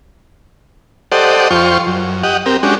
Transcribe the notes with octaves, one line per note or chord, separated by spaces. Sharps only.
G4 A4 C5 D5 D#5 F#5
F2 F4 C5 G5 C#6
F#2
G4 D#5 F#5
C4 G4 A#4
G#3 C#4 D4 F#4 G4